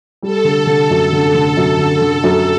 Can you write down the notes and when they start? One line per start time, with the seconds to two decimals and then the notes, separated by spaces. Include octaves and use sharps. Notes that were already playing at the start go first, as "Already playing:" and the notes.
0.23 G3 A4
0.44 D3
0.67 D3
0.90 F#2
1.12 D3
1.34 D3
1.57 F#2
1.79 D3
2.02 D3
2.24 F#2